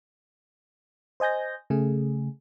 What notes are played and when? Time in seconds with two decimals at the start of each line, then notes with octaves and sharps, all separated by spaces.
1.20 C5 D#5 G#5 G6 A#6
1.70 C#3 A3 G#4